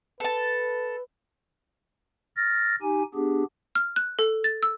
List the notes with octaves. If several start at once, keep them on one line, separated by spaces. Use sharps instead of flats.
A4 B4 A5
F6 A6 A#6
D#4 G4 G#5
B3 D4 G4 G#4
F6
F#6
A4
A6
E6